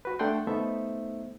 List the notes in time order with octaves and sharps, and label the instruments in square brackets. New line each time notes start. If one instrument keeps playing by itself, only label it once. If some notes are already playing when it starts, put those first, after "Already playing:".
[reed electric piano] F#4 B4
A3 D4 A4 F#5 G5 C6
A3 B3 D#4 A4 C5 E5